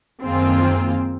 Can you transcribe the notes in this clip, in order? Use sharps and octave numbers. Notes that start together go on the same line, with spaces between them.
F#2 D#3 A#3 C4 F4 G#4